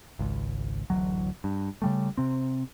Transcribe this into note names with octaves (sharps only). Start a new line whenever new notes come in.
G#1 C#2
D1 A1 D#2 F#3
G2
C#3 G3 A3
C3 C4